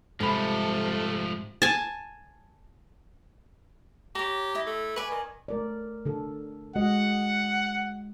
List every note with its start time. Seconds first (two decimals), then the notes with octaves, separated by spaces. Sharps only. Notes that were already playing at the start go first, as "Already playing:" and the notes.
0.20 G#2 C3 F3 G3 A3 A4 B5
1.62 G#5 A5
4.15 G4 C#5 A#5
4.55 E4 D#5
4.67 A3
4.96 B4 D5 G#5 C#6
5.11 D#3
5.48 A3 A#4 D5
6.05 D3 A4
6.76 G#3 F#4 D#5 F#5